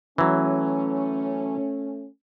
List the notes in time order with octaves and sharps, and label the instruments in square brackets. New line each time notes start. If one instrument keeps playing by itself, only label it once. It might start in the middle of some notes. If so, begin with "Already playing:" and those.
[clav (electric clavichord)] E3 F#3 [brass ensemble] A3 C#4